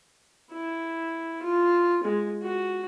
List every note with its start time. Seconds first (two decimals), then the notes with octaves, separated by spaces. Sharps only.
0.52 E4
1.43 F4
2.03 G#3
2.42 F#4